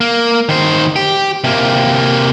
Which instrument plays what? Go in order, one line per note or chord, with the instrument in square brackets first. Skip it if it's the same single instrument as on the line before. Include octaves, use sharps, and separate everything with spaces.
[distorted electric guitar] A#3
D#3 C5
G4
C3 A#3